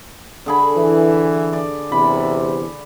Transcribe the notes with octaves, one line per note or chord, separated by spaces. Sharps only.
D3 G#4 B5
E3
D5
E2 C3 B5